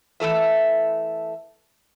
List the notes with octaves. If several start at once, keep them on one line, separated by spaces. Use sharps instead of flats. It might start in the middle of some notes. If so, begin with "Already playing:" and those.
E3 A3 A4 E5